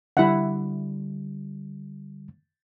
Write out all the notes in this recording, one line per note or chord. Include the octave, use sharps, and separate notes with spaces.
D3 G3 E4 E5 F#5